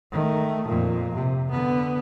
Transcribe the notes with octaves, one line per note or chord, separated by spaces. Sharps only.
D#3 A3
F2 A#2
C3
D3 B3